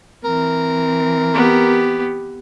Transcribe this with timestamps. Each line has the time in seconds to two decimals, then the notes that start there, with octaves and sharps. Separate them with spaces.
0.25 E3 C4 A#4
1.34 B3 G4